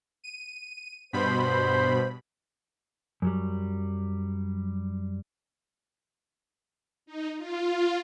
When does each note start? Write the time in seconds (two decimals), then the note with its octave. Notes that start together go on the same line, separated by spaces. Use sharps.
0.24 D#7
1.13 G2 B2 C5 B5
3.22 F#2 F#3 G3
7.06 D#4
7.37 F4